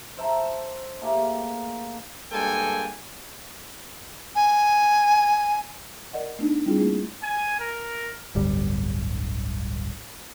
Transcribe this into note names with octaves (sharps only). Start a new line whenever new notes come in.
C5 E5 A5 A#5
A3 A#3 G4 G#4
G2 G#3 A#3 A4 G5 G#5
G#5
A#4 D5 D#5 F#5
A3 B3 D4 D#4
G3 C4 D4 E4 F4 G#4
A3 A#3 G#4
G#5
A#4
D1 G1 G3